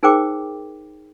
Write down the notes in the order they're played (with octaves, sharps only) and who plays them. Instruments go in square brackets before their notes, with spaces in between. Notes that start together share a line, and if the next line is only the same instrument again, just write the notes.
[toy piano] D#4 G#4 A#4 C5 G5 D6